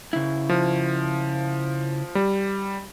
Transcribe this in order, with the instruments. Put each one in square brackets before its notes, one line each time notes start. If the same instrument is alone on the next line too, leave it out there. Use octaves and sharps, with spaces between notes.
[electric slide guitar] C#3 E4
[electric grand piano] F3
G3